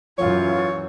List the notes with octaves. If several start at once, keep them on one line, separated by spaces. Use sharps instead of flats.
F#2 E3 F4 C#5